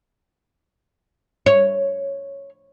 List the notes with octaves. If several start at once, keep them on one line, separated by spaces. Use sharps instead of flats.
C#5